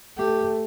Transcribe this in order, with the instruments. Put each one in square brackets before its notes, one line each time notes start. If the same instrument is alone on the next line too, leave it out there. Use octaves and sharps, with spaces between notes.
[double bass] A3 [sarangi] G4